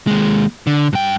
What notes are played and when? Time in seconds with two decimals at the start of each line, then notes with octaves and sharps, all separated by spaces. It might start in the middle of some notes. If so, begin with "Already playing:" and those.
0.07 D#2 G#3
0.67 D3
0.93 G2 G5